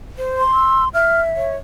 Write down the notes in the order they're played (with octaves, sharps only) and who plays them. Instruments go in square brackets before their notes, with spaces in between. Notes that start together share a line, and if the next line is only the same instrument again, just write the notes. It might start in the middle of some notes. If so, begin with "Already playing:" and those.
[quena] C5
[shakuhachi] C6
[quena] E6
[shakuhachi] E5 [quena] F6
[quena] C#5